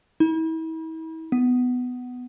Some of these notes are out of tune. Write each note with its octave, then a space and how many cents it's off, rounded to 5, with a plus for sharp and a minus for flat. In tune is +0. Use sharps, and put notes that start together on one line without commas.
E4 -40
B3 +10